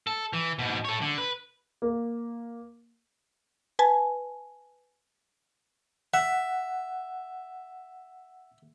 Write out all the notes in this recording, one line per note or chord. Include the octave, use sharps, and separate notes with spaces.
A4
E3
G#2 B2
A4 C#5
D3
B4
A#3
B4 G#5 A5
E5 F#5